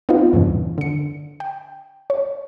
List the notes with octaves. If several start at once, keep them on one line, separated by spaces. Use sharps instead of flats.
B3 C4 D#4 F4
E2 G2 A#2 C#3 E3
D3 C#7
G5
C#5